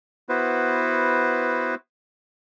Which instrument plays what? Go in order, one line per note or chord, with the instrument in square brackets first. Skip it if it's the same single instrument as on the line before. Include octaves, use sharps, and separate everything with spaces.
[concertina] B3 E4 F#4 B4 C5